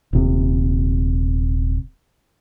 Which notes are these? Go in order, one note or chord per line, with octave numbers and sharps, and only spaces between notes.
D#1 C3